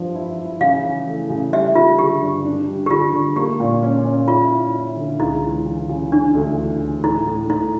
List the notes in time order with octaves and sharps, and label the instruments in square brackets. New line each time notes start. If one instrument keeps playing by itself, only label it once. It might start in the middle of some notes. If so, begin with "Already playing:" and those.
Already playing: [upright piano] G2 F3
E4
E4
[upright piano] C#3 [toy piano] F5
[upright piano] E3
A3
C#3
[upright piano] G3 [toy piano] E5
[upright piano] G3 [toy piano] F4
[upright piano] D3 [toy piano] G4
[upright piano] G2
D4
G3
[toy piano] G4
[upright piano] D3 [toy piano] F4
[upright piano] D3
[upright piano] A#3 [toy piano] G4
[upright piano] A#2
C#4
C#4
[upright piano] E4 [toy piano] F4
[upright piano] E4
E4
D3
[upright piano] C#2 [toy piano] E4
[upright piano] E3
E3
C#3
[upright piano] E3 [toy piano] D4
[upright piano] D2
E3
E3
[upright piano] A2 [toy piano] E4
[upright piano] A2
[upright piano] A2 [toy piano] E4